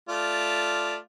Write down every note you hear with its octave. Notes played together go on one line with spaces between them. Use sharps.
A3 F4 D5